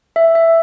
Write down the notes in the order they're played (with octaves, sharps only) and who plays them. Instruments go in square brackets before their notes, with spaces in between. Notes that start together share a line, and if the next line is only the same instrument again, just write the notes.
[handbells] E5
E5